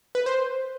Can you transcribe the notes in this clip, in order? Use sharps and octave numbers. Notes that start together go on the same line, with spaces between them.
B4
C5